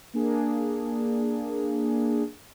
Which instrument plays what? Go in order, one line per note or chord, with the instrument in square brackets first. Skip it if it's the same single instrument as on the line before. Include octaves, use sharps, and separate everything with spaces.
[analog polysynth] A#3 D4 G#4